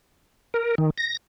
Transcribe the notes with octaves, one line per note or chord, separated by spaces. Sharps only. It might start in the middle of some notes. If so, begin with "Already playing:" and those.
A#4
D#3
A#6